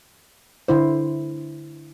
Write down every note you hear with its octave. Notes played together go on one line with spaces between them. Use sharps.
D3 E4 C5